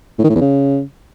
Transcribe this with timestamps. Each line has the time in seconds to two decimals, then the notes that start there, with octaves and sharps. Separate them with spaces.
0.19 A2
0.24 D#3
0.30 A2
0.36 E2
0.41 C#3